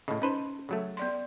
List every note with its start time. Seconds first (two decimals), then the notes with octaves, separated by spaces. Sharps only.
0.08 A2 C#3 D#5
0.22 C#4 D#4 B4 C5
0.69 C#3 F#3 A3
0.97 B3 D5 C6